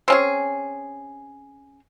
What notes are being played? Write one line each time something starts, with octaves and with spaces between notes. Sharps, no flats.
C4 C#4 G#4